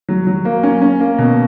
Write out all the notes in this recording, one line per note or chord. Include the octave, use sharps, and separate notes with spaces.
F#3
F#3
A#3
C#4
C#4
A#3
B2